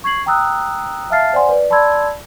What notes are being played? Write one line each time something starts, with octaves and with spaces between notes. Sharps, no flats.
C#6 G#6 C7 F#7
G5 A#5 D#6 E6 F#6
E5 F5 A5 F6 A6 C7
C5 D5 F#5 G#5 C6
B4 D5
D5 A5 B5 C6 E6 G#6